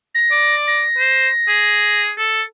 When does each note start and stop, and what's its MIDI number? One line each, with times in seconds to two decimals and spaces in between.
0.15 0.55 94
0.31 0.83 74
0.68 2.02 94
0.98 1.28 72
1.48 2.11 68
2.18 2.42 69